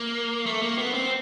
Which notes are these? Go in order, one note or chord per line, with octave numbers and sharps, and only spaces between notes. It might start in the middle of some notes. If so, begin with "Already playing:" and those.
Already playing: A#3
A3
A#3
B3
C4